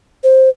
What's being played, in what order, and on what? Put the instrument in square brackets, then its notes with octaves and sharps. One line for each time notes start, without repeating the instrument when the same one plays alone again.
[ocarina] C5